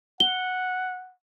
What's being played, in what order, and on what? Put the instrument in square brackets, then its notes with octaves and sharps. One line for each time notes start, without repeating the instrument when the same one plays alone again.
[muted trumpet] F#5 [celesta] G7